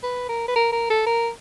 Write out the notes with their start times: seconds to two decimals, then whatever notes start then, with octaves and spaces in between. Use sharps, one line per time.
0.03 B4
0.29 A#4
0.48 B4
0.56 A#4
0.72 A#4
0.90 A4
1.07 A#4